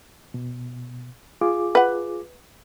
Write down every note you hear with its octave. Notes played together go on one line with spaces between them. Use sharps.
B2
F4 G#4 D6
B4 F#5